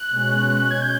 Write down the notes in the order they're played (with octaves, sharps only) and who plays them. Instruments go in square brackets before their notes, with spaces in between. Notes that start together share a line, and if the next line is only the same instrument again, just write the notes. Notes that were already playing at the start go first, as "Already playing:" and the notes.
Already playing: [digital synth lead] F#6
[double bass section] B2 G#3 C#4
[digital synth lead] G#6
G6